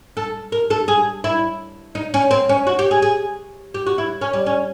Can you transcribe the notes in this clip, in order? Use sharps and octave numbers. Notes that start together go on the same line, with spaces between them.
A4
A#4
A4
G#4
E4
D#4
C#4
C4
C#4
F#4
G4
G#4
G#4
G4
F#4
E4
C#4
G3
C#4